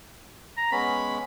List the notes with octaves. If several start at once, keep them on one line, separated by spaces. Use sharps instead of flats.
A#5
G#3 B3 C#4 B5